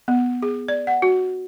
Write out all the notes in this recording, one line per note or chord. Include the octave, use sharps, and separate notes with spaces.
B3
G#4
D5
F#5
F#4